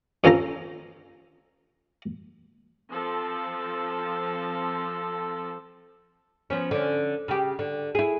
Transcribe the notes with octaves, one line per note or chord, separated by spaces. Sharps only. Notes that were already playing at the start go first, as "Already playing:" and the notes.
G2 F3 C#4 A4 C5 A#5
F3 C4 A4
F3 B3 C#4
D3 C#4
C#3 G4
D3
E4 G#4